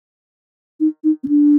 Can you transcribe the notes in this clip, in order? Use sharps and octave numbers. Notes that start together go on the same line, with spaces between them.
D#4
D#4
C4
D4